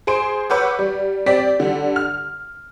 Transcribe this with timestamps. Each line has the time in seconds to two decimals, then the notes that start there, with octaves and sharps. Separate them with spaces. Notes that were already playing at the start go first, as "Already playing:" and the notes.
0.07 G#4 C5 C6 D7
0.50 B4 C#5 F#5 D6 E6 G6
0.79 G3
1.26 C4 G4 D5 B6
1.60 D3 G3
1.96 F6